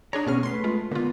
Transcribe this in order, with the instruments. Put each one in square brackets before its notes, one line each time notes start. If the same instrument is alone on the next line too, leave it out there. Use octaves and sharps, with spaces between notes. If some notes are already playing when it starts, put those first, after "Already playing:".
[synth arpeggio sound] D4 G#4 C#5 [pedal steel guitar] A#5
[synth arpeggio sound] B2 G#4 F6 [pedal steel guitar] B3 C#4
[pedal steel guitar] A3 B4 [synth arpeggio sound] C6 C7
[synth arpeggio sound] G#3 F4
[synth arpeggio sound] D3 F4 [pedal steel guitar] A#3 B3